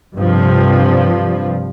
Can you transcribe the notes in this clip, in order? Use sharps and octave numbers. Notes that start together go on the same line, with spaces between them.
G2 C3 F3